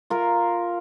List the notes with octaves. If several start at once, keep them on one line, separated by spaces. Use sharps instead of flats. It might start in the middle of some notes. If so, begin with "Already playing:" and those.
F4 A#4